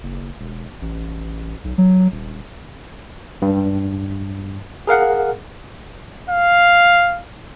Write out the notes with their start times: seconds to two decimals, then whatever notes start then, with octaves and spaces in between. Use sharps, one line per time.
0.03 F#1
0.40 E1
0.82 A1
1.64 B1
1.78 F#3
2.12 D#1
3.42 G2
4.87 G#4 A#4 F5 F#5
6.30 F5